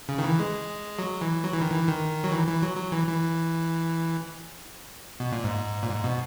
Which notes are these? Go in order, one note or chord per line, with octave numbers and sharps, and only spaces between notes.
C#3
D#3
E3
G#3
F#3
E3
F#3
E3
D#3
E3
D#3
F#3
E3
E3
F#3
F#3
E3
E3
B2
A#2
G#2
A#2
G#2
B2